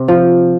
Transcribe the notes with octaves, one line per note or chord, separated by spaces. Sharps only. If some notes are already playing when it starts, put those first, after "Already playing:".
Already playing: C3 C4
F3